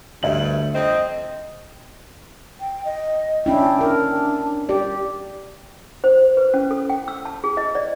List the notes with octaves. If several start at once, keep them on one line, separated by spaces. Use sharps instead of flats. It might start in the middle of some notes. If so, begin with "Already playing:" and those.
D2 G2 E5 F#7
F2 C4 D#5
G5
D#5
C#4 D4 E4 G5
D4 A#4
G4 D5
C5
B4
C#4
A4
G5
E6
A5
G#4
D#5
D5